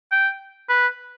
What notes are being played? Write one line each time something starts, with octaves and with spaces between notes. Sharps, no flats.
G5
B4